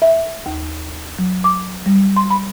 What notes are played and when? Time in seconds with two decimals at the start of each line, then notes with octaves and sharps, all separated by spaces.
0.02 E5
0.46 D#2
1.18 F#3
1.44 D6
1.86 G3
2.16 C6
2.30 B5